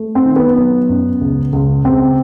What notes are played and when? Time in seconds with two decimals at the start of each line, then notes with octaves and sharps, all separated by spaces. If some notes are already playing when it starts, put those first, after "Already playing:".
Already playing: A3
0.15 C4
0.25 D#3
0.36 B3
0.57 F#3
0.89 F#2
1.21 C#2
1.53 C#2
1.84 C#2 C4